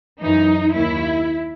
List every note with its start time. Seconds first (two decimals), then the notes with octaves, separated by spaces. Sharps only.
0.22 F#2 E3 D#4
0.74 D#2 D#3 E4